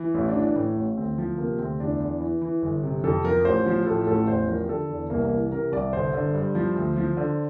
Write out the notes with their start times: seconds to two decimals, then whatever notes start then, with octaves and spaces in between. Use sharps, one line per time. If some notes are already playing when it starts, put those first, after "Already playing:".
Already playing: E3
0.14 A1 E4
0.29 D4
0.35 E3
0.42 D4
0.55 A2
0.76 A1
0.97 D2 C4
1.18 F3
1.38 C3 A#3
1.59 D2 C4
1.80 E2 D4
2.00 E2
2.21 E3
2.42 E3
2.62 G1
2.83 C3
3.04 F2 A4
3.24 F3 A#4
3.44 A1 C5
3.66 F3
3.86 A2 A4
4.07 A1 A4
4.28 E2 C5
4.48 F3 A#4
4.64 G4
4.69 D3 A4
4.89 E2
5.10 C2 A#3
5.25 A#3
5.31 E3
5.51 C3 A#4
5.72 C2 D5
5.93 G1 C5
6.13 D3
6.34 G2
6.55 F3
6.76 D2
6.96 F3
7.17 D3